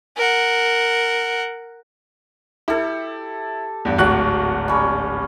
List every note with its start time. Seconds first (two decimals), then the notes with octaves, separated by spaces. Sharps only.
0.17 A#4 F#5
2.68 E4 G4 A4
3.85 E2 G2
3.98 D1 G#1 F#3 F#4 F#6
4.68 G3 C#4